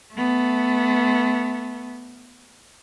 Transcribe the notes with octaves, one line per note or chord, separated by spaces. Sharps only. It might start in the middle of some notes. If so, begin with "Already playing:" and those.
A3 B3